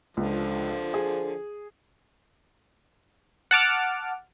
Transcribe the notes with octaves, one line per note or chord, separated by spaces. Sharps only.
C#2 D3 F3
G#4
F#5 A5 D6 F6